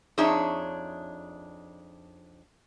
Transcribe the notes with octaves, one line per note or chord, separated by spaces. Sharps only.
F2 D4 D#4 G#4 C#5 E5